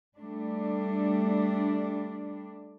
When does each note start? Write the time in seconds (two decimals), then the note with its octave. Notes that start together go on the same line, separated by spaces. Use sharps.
0.17 G3 A3 D4